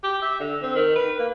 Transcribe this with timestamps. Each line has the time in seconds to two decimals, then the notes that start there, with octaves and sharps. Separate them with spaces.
0.04 G4
0.22 E5
0.40 D3
0.62 C4
0.75 D#3
0.95 B4
1.19 A#3